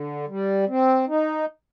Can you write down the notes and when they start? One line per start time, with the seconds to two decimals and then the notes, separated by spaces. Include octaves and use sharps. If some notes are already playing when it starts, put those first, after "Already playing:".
Already playing: D3
0.28 G3
0.68 C4
1.09 D#4